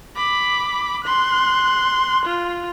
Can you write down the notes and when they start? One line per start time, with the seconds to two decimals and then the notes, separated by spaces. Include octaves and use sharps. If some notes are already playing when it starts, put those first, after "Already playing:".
0.16 B5 D6
1.04 C6 F#6
2.25 F4